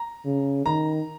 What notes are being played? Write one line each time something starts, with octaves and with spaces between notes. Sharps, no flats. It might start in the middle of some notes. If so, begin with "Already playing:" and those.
Already playing: A#5
C#3
D#3 A#5